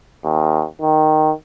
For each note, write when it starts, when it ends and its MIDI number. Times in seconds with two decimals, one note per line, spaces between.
0.24 0.65 39
0.81 1.32 51